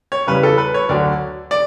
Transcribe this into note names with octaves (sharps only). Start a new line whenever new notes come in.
C#5
E2 C#3 G3 B4
A4
B4
C#5
D2 D3 F#3 D5
D5